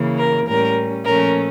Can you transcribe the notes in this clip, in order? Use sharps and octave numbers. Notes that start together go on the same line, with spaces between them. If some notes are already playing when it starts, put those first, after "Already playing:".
Already playing: C#3 E3 A#3
A#4
A2 G3 C#4 A#4
A#2 F3 A3 C#4 A#4